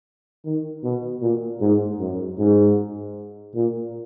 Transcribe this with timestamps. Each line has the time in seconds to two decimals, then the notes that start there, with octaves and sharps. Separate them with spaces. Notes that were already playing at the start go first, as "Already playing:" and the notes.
0.45 D#3
0.84 B2
1.22 A#2
1.61 G#2
2.00 F#2
2.38 G#2
3.55 A#2